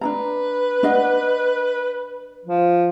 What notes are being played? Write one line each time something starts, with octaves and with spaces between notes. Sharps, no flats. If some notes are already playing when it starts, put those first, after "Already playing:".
D4 D#4 B4 A#5
D4 D#5 F#5
F3